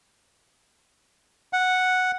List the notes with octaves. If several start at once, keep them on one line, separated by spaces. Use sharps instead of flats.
F#5